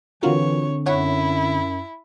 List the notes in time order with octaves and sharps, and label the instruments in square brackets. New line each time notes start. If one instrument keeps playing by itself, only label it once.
[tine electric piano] D3 C4 D4 [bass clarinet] E3 [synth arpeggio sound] F4 F#4 A#4 [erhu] C#5
[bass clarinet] F#2 [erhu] E4 [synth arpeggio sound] C#5 F#5